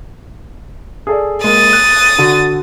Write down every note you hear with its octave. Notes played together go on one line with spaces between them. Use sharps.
G#4 A4 D5
G#3 A#3 D#6 A6
F#6
D3 F#4